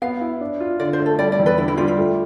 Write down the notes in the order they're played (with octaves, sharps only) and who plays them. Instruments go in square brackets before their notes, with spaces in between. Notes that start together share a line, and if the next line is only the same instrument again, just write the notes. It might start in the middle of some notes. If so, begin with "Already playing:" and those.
[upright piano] B3 [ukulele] F5
[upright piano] E4
D4
F4
[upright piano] D3 [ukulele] D5
[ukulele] C5
[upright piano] A3
[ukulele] A4
[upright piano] G3 [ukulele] D5
[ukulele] D5
[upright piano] E2
[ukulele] B4
[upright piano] D3 [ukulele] E4
[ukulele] E4
[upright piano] G3 [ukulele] F4
[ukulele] F4
[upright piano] A3